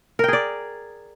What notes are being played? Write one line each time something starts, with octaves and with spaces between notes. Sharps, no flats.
G#4 A#4 D5 G5